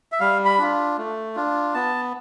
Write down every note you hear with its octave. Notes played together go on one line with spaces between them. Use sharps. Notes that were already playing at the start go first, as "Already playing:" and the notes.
E5
G3 F5
B5
D4 F4
A3
D4 F4
B3 A5